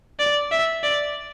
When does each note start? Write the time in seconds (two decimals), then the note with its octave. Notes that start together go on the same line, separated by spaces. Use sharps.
0.20 D5
0.52 E5
0.83 D5